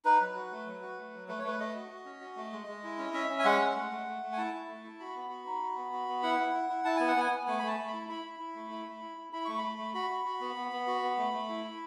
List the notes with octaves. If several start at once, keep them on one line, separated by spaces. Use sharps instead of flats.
D#4 B4
F#3
F#4
A3
F#3
F#4
A3
F#3
A3 B4
C#5
A3 B4
A3 D#5
F#4
F#4
C#4
F#4
A3
G#3
G#3
E4
C#4
C#4 E5
C#4
G#5
G#3 F#5
G#3
A3
A3
A3
A3
G#5
E4 A5
E4
A3
E4
F#4 B5
B3
F#4
D#4
F#4
B3
F#4
B3
E4 F#5
E4
E4
E4
E4 A5
B3 G#5
F#5
B3 G#5
B3
A3 G#5
B5
A3 A5
A3
B5
E4
E4 B5
E4
E4
A3
E4
A3
E4
E4
E4 B5
A3 C#6
B5
A3
A3
F#4 B5
F#4
F#4
B3
B3
B3
F#4
B3
A3
A3
E4
E4